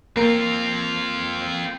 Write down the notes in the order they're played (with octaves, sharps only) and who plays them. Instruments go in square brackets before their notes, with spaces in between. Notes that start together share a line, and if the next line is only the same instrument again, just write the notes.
[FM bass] A#3 [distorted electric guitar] C4 F4